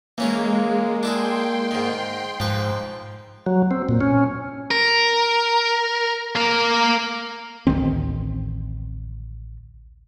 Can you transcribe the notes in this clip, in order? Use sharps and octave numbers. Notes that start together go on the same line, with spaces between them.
E3 G#3 A#3 C#4 F4
D4 E4 G#4 G5 C6
G#2 D#3
G#2 F3 B4
F#3
C4
A#2
C#4
A#4
A#3 A#4
A1 D2 D#3 C4